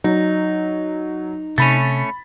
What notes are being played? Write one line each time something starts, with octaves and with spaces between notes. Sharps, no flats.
F#3 D#4
C3 A3 C#4 B5 A6